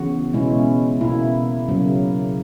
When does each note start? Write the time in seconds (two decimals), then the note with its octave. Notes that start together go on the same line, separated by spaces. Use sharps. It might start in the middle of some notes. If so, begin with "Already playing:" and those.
Already playing: C#3 E3 B3 F#4
0.33 B2 G#3 C#4 E4
1.01 B2 A#3 E4
1.69 C#3 F#3 A#3